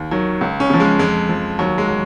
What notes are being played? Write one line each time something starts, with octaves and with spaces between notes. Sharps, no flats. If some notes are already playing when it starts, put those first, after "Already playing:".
Already playing: D#2
D#3 F#3
C#2
C#4
C#3 F3
G#3
F2 G#3
F3
D#2 F#3
G#3
F#3